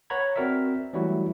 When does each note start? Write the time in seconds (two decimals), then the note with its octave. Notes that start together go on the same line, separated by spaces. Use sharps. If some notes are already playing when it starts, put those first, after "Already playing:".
0.10 B4 C#5 F#5 A#5 B5 G#6
0.36 C4 F#4 A#4 D5 E5
0.93 E3 F#3 G3 A3 E4 F#4